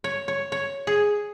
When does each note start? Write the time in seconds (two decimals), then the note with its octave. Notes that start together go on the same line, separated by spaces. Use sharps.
0.04 C#5
0.28 C#5
0.52 C#5
0.87 G#4